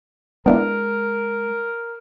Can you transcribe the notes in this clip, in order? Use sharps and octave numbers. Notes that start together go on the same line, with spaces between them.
G#3 B3 D4 E4 A#4